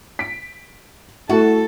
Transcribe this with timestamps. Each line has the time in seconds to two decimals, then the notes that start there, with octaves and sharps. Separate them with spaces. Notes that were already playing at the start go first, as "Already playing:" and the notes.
0.19 B6 D7
1.30 A3 E4 F#4 A4